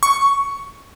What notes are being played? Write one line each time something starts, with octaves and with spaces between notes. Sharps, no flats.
C#6